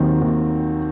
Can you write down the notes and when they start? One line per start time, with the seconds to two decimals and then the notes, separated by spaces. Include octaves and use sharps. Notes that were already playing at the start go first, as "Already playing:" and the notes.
Already playing: D#2 D#3 F#3 C4
0.21 D#2